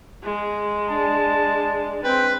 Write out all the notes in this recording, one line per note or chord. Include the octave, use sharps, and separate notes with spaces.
G#3
D4 A5
C4 B4 G5